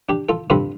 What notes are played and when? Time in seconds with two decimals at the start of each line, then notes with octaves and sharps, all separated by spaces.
0.09 D4 G4
0.29 F4 A4
0.50 G2 D3 G3 C4 F4 A4